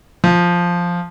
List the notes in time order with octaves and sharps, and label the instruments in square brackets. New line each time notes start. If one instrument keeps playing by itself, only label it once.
[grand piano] F3